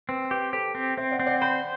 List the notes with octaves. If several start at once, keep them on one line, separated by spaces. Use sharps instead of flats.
C4 B4
G4 B4
G4 A4 C5
C4
C4 C5 E5
D5 F#5
C4
D5 F#5
C5 G5 B5